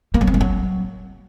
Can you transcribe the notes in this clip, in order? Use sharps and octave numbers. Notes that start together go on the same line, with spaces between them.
A#3
F#3
C4
G#3
F#3